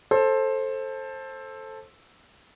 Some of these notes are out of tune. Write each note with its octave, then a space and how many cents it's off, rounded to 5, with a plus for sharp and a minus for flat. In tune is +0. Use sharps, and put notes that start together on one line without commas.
A4 +0 C5 +20